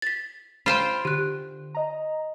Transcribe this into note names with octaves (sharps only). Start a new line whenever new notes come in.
A6 B6
F4 C5 G5 B5
D3 G4 F#6
D#5 A#5